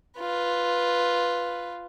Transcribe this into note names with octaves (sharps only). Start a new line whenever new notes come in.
F4 B4